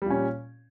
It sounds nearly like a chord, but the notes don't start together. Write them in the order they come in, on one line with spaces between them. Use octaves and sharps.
G3 A#2 C#4